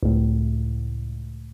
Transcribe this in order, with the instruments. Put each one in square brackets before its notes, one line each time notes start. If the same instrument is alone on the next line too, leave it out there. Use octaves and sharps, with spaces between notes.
[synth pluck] C#2 A2